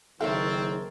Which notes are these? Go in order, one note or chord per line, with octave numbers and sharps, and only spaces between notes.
F#1 D#3 C4 A4 A#4 C#5 E5